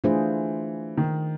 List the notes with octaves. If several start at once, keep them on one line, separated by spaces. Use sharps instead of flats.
E3 A3 D4 F4 G#4 C5
D#3